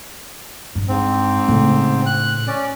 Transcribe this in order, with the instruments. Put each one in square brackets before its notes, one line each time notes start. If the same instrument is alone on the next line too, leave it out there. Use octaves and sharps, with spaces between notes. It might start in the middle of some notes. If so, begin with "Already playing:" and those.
[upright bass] G2
[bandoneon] G#2 C4
[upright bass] A2 C#3
[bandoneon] F#6
C#4 D5